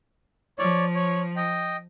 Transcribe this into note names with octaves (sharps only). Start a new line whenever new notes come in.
F3 C#5 D5
C#5
D#5 G5